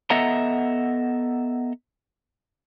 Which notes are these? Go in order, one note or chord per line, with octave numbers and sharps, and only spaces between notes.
B3 A4 D#5 E5 F#5 A#5